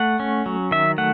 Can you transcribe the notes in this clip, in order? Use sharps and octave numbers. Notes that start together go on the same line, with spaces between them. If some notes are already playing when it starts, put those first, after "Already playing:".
Already playing: A3 F#5
C#4
F#3
D#3 E5
A3 F#5